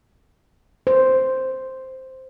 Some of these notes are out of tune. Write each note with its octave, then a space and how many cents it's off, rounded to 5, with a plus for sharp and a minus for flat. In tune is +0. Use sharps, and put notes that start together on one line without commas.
C5 +0